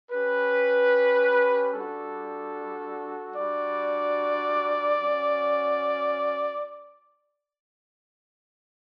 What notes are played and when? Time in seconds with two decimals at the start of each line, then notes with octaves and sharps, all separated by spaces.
0.11 C#4 G4 B4
1.74 G3 D4 F#4 A4
3.36 G3 D4 F#4 D5
4.98 C#4 F#4